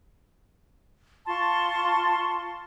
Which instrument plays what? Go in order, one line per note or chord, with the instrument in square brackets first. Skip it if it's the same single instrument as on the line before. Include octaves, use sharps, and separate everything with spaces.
[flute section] F4 A5 C6 C#6